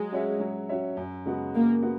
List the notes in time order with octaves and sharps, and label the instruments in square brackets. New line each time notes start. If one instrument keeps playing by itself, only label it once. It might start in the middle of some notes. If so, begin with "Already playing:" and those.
Already playing: [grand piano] F#3 [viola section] G#3
[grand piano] C#4 F#4 C#5 E5
F#3
C#4 F#4 C#5 E5
F#2
C#3 G#3 B3 F#4
[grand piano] F#2 [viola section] A#3
[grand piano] B3 F#4